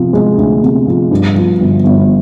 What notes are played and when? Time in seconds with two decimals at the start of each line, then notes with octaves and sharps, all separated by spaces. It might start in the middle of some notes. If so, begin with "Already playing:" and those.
Already playing: C3 F3
0.13 G#3
0.37 D2
0.63 C3
0.87 F3
1.11 G2
1.35 F3
1.60 G1
1.84 G1